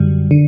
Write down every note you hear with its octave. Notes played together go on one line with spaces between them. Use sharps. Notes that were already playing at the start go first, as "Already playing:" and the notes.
Already playing: F#2 D3 G3
D3